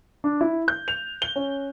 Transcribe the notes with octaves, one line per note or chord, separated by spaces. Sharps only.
D4
E4
G6
F7
G7
C#4